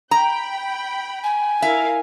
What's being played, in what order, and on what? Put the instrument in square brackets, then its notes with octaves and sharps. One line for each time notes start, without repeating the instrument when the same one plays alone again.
[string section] G5 B5 [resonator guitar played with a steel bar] A#5
[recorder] G#5
[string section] E4 A#4 F5 [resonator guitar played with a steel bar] E5